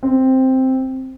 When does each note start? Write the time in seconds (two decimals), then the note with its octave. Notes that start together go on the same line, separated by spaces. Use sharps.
0.03 C4